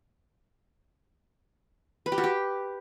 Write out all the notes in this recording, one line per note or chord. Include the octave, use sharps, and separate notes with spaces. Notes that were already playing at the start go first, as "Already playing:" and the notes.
B4
G4
F#4
G4